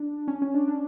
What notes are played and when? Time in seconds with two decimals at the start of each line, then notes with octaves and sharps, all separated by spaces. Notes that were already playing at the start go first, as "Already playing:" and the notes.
Already playing: D4
0.28 C#4
0.42 C#4
0.54 D4
0.68 D4